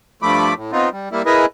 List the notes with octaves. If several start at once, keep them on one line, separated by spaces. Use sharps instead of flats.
G2 F3 A3 B5 D6
A2
B3 C4 D#4 F4
G3
G3 A#3 E4
E4 G#4 A#4 B4 D#5 E5